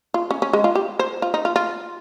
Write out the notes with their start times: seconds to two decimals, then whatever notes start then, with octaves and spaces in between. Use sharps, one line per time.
0.14 F4
0.31 C#4
0.42 C#4
0.53 G#3
0.64 F4
0.75 G4
0.99 C5
1.22 F4
1.34 D#4
1.45 F4
1.56 F4